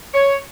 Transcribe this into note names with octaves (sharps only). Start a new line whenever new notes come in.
C#5